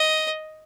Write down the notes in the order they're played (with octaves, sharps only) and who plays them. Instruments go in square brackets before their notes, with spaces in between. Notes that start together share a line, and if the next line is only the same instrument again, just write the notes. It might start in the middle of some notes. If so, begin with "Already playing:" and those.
Already playing: [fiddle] D#5